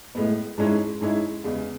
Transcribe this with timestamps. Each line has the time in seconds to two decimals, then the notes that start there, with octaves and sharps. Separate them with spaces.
0.15 A2 G#3 B3
0.58 G#2 G#3 C#4 E4
1.01 G#2 G#3 C#4 E4
1.44 E2 C#3 G#3